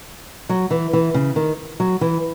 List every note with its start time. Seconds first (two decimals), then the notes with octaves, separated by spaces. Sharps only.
0.49 F#3
0.71 E3
0.93 E3
1.14 C#3
1.36 D#3
1.80 F#3
2.01 E3